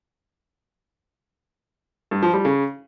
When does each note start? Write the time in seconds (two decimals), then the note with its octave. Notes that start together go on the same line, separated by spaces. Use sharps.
2.11 G2
2.23 F3
2.34 G3
2.45 C#3